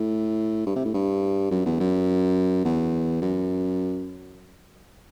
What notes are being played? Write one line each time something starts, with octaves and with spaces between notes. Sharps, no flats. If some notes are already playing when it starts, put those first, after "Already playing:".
Already playing: A2
G2
C3
A2
G2
F#2
E2
F#2
E2
F#2